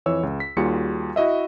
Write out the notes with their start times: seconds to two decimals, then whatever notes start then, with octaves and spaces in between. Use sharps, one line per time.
0.06 F2 E3 C#5 E6
0.23 C#2
0.40 B6
0.57 D#2 G3 F4 F#4 G#4 C#7
1.16 E4 F#4 D#5 E5